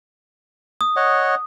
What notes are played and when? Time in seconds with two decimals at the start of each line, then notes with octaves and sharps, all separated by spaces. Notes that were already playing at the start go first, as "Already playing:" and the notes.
0.81 D#6
0.96 C#5 D#5 F#5